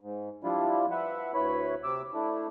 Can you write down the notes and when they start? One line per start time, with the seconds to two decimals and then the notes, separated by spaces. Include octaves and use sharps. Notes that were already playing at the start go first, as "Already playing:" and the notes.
0.01 G#2
0.44 F3 G3 D4 E4 F4
0.91 B4 E5 F#5
1.34 D2 E4 B4 C#5 B5
1.84 C3 D6 E6
2.14 A3 D4 E4